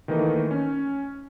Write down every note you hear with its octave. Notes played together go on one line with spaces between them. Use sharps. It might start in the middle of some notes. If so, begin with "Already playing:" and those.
D#3 E3 A3 A#3 D#4
C#4